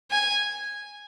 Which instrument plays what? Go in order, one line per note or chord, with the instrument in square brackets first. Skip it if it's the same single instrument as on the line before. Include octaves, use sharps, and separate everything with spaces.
[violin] G#5